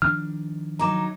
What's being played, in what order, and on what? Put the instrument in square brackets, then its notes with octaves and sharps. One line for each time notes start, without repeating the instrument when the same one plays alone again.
[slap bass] D#3 F3 D4 [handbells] F6
[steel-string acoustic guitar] F#3 D#4 [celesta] A#5 D6 E7